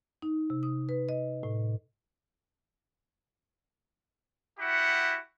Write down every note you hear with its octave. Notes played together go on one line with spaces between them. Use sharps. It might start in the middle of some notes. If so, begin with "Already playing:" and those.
D#4
C3
D#6
B4
D#5
A2
E4 F#4 G4 F#5